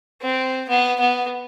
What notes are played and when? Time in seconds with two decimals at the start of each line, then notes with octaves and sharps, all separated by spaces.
0.22 C4
0.69 B3
1.00 B3